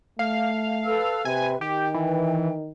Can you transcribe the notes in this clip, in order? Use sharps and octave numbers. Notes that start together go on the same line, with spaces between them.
A3 F5
A4 B4 E6
C3 B4 G#5
D#3 G4 G5
E3